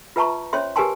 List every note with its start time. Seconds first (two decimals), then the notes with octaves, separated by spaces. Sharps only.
0.16 F4 B4 E5 A5 A#5 C#6
0.53 C#4 C5 C#5 E5 C6
0.76 G4 A#4 B4 G#5 A5 C6